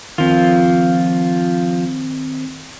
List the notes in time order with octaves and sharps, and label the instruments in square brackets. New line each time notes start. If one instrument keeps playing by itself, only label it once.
[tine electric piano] D#3 C4 [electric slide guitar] F3 F4